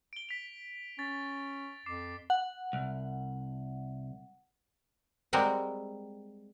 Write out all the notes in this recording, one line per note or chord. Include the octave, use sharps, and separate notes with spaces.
D7 G7
B6 F7
C#4 A6 B6
F2 D6 C7
F#5
C2
G3 G#3 C4 A#4 F#5